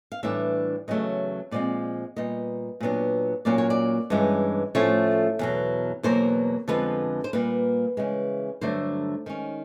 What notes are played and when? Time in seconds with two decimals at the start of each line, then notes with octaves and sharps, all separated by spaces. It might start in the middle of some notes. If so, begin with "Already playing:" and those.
0.12 F5
0.23 A2 E3 G3 B3 D4 E5
0.88 E2 C#3 F#3 A3 D#5
1.51 A#2 F3 G#3 C4 D5
2.17 A#2 G3 B3 D#5
2.80 A#2 F#3 B3 D4
3.45 A#2 F#3 A#3 C#4 D5
3.58 C#5
3.70 D5
4.10 G2 E3 G#3 C#4
4.75 A2 F3 A3 C#4 C#5
5.39 E2 B2 F#3
6.03 E2 B2 F#3 A#3 C5
6.68 F2 D3 F3 G#3 B3 B4
7.24 C5
7.33 A#2 G3 A#3 B4
7.97 C#3 E3 G#3
8.61 G2 D3 F#3 A3 D4 C5
9.26 D#3 G#3 C#4